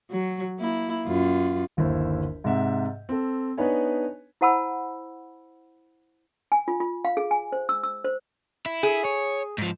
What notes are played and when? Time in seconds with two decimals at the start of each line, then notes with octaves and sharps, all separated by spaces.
0.11 F#3
0.59 A#3 E4
1.07 F#2 F4
1.77 G1 D#2 E4 C5
2.44 G#2 C3 E5 F#5
3.09 C4 A4
3.58 B3 D4 D#4 B4 C#5 G#5
4.41 E4 C5 F#5 A5 B5 E6
6.52 G#5
6.68 F4
6.80 F4
7.05 F5
7.17 G#4
7.31 G#5
7.52 C5
7.69 E6
7.83 E6
8.04 C5
8.66 E4
8.83 G#4
9.05 C#5
9.58 G#2 F3